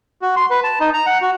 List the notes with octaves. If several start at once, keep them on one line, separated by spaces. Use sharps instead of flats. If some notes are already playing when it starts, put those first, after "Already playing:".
F#4
C6
B4
A5
D#4
A#5
F#5
F#4